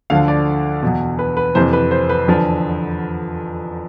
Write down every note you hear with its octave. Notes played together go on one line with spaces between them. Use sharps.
D2 D3 F3 F5
D5
E2 B2
B4
B4
F2 C3 E3 C5
B4
C5
B4
E2 D3 F3